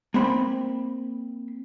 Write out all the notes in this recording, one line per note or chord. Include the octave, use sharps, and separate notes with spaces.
A#3 C4 B5